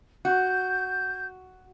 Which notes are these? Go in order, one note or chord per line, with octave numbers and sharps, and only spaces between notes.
F#4 G6